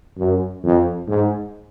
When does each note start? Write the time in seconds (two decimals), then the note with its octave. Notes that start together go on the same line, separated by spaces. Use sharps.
0.18 F#2
0.63 F2
1.08 G#2